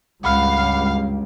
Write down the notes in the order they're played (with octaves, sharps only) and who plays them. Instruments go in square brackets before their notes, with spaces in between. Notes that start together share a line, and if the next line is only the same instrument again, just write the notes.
[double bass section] C#2 G2 [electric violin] F5 [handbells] F#5 B5 F6